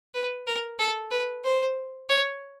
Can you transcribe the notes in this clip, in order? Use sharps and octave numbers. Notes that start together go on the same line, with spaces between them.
B4
A#4
A4
B4
C5
C#5